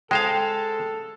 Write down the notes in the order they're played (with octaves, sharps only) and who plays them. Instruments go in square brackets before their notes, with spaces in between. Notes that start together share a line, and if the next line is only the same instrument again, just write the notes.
[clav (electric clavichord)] G#3 C5 F5 [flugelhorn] A4 [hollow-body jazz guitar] G5